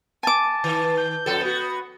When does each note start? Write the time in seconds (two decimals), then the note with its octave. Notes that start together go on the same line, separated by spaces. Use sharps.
0.23 G#5 A5 D6
0.64 D#3
0.98 G6
1.26 F#2 F3 A4
1.41 B3 F#4